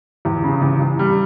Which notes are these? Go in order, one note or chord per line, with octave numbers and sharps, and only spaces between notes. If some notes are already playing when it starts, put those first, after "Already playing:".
E2
C#3
E2
E2
G3